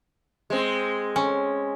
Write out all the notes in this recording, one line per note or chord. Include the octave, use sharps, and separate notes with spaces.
G#3 C4
C#4